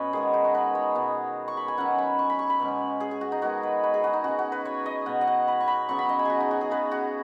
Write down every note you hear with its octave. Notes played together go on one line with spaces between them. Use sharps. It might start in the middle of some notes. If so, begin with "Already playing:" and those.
Already playing: B2 C#4 B4 C#5 D#5
D#3 G#3 B3 G#4
D#4
F#4
B4
C#5
B2 G#3 B3
C#6
B5
G#5
D#3 F#3 C#4 F#5
B5
C#6
B5
C#6
B5
B2 G#3 C#4
G#4
G#4
F#4
D#4
D#3 G#3 B3 F#4
B4
B4
G#4
F#4
D#4
C#3 B3 F#4
F#4
B4
C#5
D#5
B2 B3 F#5
D#5
F#5
B5
C#6
B5
C#3 F#3 B3 C#6
B5
D#5
G#5
F#4 G#4
D#4
F#4
G#4
C#3 B3 B4
F#4